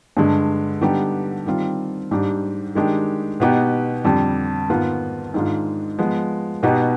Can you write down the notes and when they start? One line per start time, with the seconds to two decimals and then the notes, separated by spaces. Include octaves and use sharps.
0.17 G2 D3 G#3
0.81 D3 G3 B3 D#4 G4
1.46 D#3 G3 C4 F4
2.11 G#2 G3 D4 G4
2.75 D#3 G#3 D4 G4
3.40 B2 B3 D#4 G4
4.04 F2 D3 G3
4.70 G#2 D#3 B3 F4
5.34 G#2 D#3 G#3 D4 F4
5.98 F3 G#3 B3
6.63 B2 B3 D#4 G4